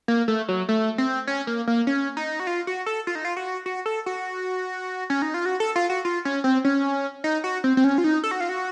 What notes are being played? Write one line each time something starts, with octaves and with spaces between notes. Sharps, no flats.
A#3
A3
F#3
A3
C4
C#4
A#3
A#3
C#4
D#4
F#4
F4
F#4
A4
F4
D#4
F4
F#4
F#4
A4
F#4
C#4
D#4
F4
F#4
A4
F4
F#4
F4
C#4
C4
C#4
D#4
F#4
C4
C4
C#4
F4
D#4
A4
F#4
F4
F#4